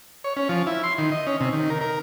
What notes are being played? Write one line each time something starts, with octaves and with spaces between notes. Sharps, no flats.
C#5
C#4
F3
E4
C6
D#3
D#5
C#4
C3
D#3
A#4
A#4